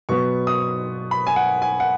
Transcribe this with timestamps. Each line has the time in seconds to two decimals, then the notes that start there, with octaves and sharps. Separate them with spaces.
0.09 B2 F#3 B3 C#6
0.47 D#6
1.11 B5
1.27 G#5
1.36 F#5
1.62 G#5
1.80 F#5